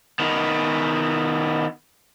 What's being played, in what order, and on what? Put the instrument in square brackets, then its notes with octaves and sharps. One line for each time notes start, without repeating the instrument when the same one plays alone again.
[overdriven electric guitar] D#3 B3